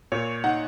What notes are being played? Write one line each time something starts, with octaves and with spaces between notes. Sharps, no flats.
A#2 C#5
D#4 F#5